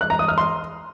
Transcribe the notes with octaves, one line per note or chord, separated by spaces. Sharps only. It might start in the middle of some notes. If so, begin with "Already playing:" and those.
F#6
A#5
D#6
F6
C6